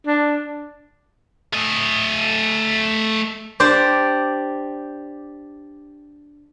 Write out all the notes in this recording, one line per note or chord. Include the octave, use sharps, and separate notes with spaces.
D4
A3 D#5
D4 G4 C5 D5